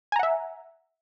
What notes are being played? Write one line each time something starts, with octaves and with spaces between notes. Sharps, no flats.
E5 F#5 G#5 A#5